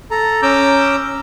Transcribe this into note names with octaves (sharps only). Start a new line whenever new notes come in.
A4 A#5
C#4 A#5 D6 E6 G6